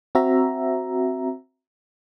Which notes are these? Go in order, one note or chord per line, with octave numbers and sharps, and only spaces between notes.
C4 F#4 E5 A#5